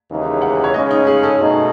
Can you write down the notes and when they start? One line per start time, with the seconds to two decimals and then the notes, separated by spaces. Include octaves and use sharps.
0.09 D#2 C#3 E3 G#3 D#4
0.42 F#5
0.64 C#5
0.74 C#3 G#3 C#4 D#5
0.91 D#4
1.07 G#4
1.23 A4
1.40 B2 A3 D#4